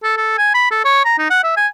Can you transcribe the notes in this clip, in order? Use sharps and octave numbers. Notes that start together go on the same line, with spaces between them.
A4
A4
G#5
B5
A4
C#5
A#5
D#4
F#5
E5
G#5